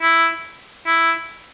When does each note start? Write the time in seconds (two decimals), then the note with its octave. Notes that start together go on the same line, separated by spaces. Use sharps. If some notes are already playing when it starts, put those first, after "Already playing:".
0.02 E4
0.86 E4